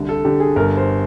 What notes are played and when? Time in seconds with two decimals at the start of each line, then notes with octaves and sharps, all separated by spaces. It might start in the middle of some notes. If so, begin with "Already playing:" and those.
Already playing: C2 D3
0.09 A4
0.25 D3 G4
0.40 G#4
0.56 G1 A#4
0.77 C5